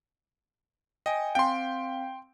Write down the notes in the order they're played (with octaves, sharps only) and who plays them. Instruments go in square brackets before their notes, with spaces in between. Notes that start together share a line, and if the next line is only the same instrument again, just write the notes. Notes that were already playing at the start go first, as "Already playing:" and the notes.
[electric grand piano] D#5 [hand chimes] G5 G#5
[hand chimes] C4 F5 [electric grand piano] G5 C6